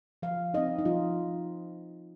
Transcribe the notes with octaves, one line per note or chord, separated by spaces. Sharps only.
F3 F5
C4 D#4 D#5
D#4
F3 F4